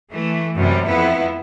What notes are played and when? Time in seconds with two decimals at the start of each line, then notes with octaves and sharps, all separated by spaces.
0.12 E3 A3
0.56 F#2 C3 G3
0.87 F2 B3 E4